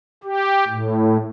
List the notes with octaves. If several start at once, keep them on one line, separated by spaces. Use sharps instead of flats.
G4
A2